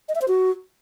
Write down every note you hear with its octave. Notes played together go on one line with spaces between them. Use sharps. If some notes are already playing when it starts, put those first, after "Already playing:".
D#5
E5
C5
F#4